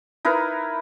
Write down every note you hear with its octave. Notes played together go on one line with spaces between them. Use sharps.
D#4 E4 A#4 B4